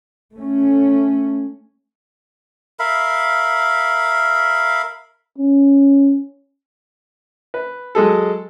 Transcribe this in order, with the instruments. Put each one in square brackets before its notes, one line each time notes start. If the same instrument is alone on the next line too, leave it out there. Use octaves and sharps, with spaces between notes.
[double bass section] A3 C#4
[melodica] A#4 E5 F5 B5
[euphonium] C#4
[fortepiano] B4
F#3 G#3 G#4 A4